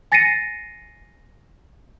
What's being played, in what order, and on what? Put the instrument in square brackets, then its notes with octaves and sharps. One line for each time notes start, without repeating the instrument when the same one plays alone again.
[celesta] G#5 A6 A#6 C7 C#7 D#7